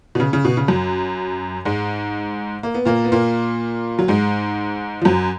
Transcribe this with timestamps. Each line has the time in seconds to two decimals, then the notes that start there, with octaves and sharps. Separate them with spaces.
0.15 B2
0.20 C#3
0.33 C#3
0.45 B2
0.57 C#3
0.68 F#2 F#3
1.65 G#2 G#3
2.63 A#3
2.74 B3
2.85 A#2 A#3
3.05 B3
3.12 A#2 A#3
3.99 F#3
4.08 G#2 G#3
5.02 F3
5.05 F#2 F#3